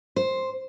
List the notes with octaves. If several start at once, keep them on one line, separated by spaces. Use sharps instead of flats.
C5